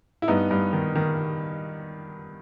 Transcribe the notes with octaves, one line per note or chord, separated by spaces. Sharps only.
E4
G2 B3 D#4
G2
D#3
D#3